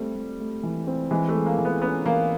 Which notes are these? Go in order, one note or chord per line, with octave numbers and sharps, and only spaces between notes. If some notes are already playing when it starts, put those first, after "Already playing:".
Already playing: G3 A3 C4
A3
A3
E3
C4
E3 G#3
A3
G#3
A#3
E3
B3
B3 C#4
E3 A#3